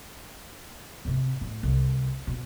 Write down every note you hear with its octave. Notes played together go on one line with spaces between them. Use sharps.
G#1 C3
A2
C2
B2